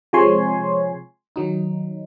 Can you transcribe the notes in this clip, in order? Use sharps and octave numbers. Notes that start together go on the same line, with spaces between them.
C3 F3 G#3 C#5 G#5 C6
D#3 F#3 D#4